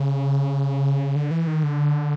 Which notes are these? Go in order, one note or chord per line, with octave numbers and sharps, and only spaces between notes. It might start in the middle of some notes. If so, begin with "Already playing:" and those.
Already playing: C#3
D3
E3
D#3
D3